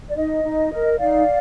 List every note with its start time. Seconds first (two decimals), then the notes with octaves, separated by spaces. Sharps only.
0.09 D5
0.16 D#4 D#5
0.43 D#4
0.71 A#4
0.99 D#4 D5 F5